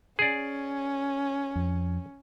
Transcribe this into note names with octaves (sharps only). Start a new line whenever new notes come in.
C#4 G#4 D5
F2